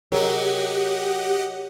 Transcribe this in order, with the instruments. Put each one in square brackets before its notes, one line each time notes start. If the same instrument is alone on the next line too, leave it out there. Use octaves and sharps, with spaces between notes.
[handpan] C3 G#4 A#4 [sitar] F#3 [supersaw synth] G4 D#5 F#5